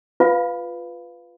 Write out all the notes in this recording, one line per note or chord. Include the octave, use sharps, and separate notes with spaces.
F4 B4 F5 B5